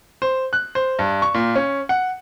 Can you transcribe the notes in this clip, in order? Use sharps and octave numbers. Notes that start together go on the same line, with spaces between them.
C5
F#6
C5
G2
C#6
A#2
C#4
F#5